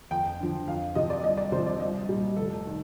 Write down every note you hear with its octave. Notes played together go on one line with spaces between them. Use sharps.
F2 G5
D3 F3
F2 F5
C3 F3 D#5
D5
C2 D#5
D5
C3 F3 C5
D5
C2 D#5
A#2 G3
F1 A4
D#3